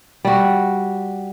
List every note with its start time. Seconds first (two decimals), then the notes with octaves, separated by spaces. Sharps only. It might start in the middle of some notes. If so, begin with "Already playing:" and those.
0.25 G3 F#4